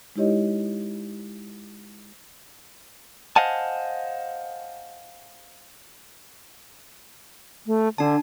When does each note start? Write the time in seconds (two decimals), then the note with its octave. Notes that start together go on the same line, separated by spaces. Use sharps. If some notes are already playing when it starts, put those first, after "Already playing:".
0.16 G#3 D#4 E4 G4 C#5 D#5
3.36 C5 D#5 F5 F#5 G#5 A5
7.67 A3
7.98 D3 D4 A5